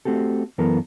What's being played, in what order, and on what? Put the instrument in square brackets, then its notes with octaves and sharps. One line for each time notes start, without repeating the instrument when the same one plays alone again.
[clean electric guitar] A3 C4 F#4 G4 A4
F#2 E3 B3 A4 A#4